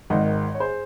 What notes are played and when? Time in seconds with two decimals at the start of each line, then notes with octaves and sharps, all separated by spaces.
0.10 G#1 G#2 D#3 D#5 F#5
0.54 C#5
0.60 G#4 C5